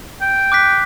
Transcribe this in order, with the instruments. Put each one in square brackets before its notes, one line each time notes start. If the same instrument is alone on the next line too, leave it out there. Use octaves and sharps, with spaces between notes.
[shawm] G5
[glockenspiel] D6 F#6 B6